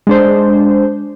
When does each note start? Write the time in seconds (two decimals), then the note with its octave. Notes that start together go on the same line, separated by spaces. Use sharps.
0.07 G#3 D4 C5